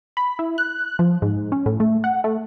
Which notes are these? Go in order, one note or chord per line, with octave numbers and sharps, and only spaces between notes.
B5
E4
F#6
F3
G#2
C#4
A2
A3
F#5
A3